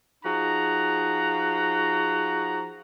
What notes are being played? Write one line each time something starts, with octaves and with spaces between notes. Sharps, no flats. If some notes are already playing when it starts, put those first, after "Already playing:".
F3 D#4 F#4 G#4 A#5